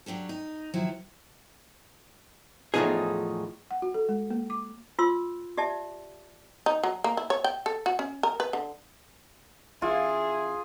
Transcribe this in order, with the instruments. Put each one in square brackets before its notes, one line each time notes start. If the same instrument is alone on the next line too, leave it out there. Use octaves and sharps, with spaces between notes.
[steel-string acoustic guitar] F#3 D4 G4 A4
D#4
D#3 F3 F#3 E4
[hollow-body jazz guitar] E2 A2 C3 F3 D#4 G#4
[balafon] F#5
F#4
A4
G#3
A#3
D6
[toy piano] F4 C6 E6
G4 D5 E5 A5
[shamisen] D#4
F#3
A#3
E4
C#5
G5
A4
F#4
C#4
A#4
B4
D3
[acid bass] A1 [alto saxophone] E4 [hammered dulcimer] F4 [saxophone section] G#4